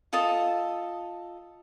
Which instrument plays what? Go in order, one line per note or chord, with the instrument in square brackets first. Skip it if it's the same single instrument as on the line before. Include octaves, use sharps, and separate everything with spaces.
[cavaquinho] F4 A4 D#5 A5